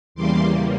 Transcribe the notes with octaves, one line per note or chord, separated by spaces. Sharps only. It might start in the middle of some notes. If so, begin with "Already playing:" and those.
E2 C#3 E3 G3 A#3 C6 D6